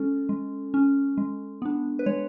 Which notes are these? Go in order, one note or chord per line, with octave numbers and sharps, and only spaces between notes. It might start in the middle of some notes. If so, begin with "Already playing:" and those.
Already playing: G#3 C#4 A4
G#3
C#4
G#3
B3 D4
B4
G#3 C#5